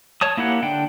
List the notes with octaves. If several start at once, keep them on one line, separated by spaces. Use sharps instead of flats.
C#5 A5 D#6
A#3 E4 G4 F#5
D3 D4 G5